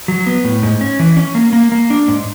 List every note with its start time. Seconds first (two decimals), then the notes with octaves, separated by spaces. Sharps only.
0.08 F#3
0.27 B3
0.44 A2
0.63 G#2
0.81 C#4
0.99 E3
1.17 C#4
1.35 A#3
1.53 A#3
1.72 A#3
1.90 D4
2.08 G#2